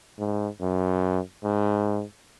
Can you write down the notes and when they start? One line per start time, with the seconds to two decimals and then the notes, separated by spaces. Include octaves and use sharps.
0.19 G#2
0.61 F#2
1.44 G#2